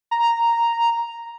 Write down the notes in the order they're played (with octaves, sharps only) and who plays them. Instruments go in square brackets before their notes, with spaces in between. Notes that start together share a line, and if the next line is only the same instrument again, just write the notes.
[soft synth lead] A#5